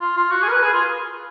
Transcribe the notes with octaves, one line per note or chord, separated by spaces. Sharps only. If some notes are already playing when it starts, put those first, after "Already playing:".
F4
F4
F#4
G#4
A#4
B4
G#4
F4